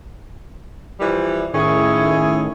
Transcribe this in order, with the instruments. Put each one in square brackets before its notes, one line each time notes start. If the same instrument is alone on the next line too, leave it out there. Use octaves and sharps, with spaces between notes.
[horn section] E3 F3 G3
[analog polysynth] A2 D#3 [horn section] C#4 E4 G#4